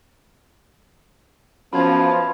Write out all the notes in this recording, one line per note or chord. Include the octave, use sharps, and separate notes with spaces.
F#2 F3 B3 F4 A5 B5 G#6